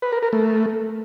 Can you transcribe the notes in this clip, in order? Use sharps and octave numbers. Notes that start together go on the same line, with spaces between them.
B4
A#4
A#4
A3